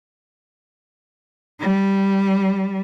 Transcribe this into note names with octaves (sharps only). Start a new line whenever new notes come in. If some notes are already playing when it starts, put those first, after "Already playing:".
G3